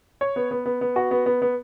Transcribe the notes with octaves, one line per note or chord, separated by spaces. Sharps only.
C#5
B3
B3
B3
B3
F#4
B3
B3
B3